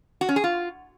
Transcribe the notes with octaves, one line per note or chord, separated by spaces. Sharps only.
F#4
C#4
G#4
F4